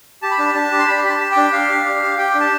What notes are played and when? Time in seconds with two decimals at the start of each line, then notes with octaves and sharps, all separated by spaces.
0.22 G4 A5
0.31 B5
0.39 D4 A5
0.55 D4 A5
0.71 G4
0.79 C6
0.87 G4 B5
1.04 G4 B5
1.10 A5
1.20 G4
1.31 G5
1.37 D4
1.53 D4 F5
1.69 G4
1.86 G4
2.02 G4
2.18 G4 G5
2.35 D4
2.40 A5